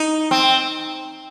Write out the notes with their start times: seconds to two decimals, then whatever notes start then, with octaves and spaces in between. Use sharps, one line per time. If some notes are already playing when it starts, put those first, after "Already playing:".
Already playing: D#4
0.31 C4